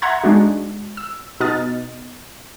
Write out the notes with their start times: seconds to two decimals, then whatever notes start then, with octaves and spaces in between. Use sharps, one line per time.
0.02 E5 F#5 A#5 C6 G#6
0.24 G#3 D4 D#4 F#4
0.97 E6
1.40 B2 D#4 D#5 F6 A6